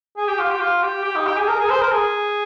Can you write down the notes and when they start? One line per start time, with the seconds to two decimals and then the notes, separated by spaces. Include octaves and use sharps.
0.17 G#4
0.28 G4
0.39 F4
0.50 G4
0.60 F4
0.83 G4
1.04 G4
1.15 D#4
1.26 G4
1.37 G#4
1.48 A#4
1.59 G#4
1.70 C5
1.81 A#4
1.92 G#4